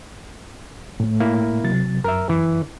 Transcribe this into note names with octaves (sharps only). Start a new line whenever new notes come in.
A2 A3
A#3 E4
C3 F#3 A6
F#2 A#4 E5
E3